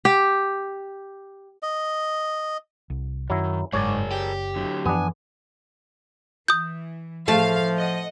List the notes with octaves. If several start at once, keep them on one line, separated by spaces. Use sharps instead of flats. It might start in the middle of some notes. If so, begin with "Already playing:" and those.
G4
D#5
C2
F#2 D#3 F#3 E4
F#1 G#2 G#4 A#4 C#5 D5 G#5
G4
D3 F#3
F#2 E3 F3 B3 D4 G#5
E3 D#6 G6
A2 F3 A3 F5 A5
D#5 F#5